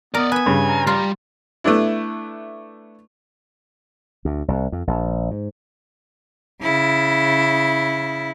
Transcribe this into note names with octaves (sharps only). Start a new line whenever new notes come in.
B3 A#4 D5 D#5
B4 E5 G#5
G2 C#3
A#5
G3 F4
A3 B3 D4 E4
D2
C2
F2
A#1
G#2
C#3 E4